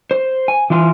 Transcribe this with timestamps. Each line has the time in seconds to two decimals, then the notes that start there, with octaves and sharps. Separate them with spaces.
0.11 C5
0.48 G#5
0.70 E3 E4 F4 G#5